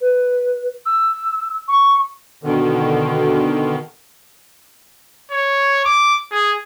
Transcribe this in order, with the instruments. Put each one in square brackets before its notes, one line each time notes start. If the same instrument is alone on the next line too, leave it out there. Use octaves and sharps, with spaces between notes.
[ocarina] B4
E6
C#6
[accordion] B2 D3 D#3
[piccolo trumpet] C#5
D6
G#4